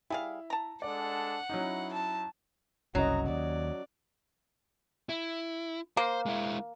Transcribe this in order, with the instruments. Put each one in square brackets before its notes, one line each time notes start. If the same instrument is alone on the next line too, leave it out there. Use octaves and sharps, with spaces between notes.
[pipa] G3 G#4 F5 [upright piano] E4
[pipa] A5 A#5
[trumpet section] G#3 D4 A4 [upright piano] D5 [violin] F#5
[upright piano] F#3 C#4 D#4 [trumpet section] E4
[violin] A5
[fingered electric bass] F#1 C2 [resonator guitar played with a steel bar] F#3 [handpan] C#4 D#5 [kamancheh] A#5
[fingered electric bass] D#2 [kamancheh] D5
[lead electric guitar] E4
[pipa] A#3 [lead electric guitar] C5
[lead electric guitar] G#3 E4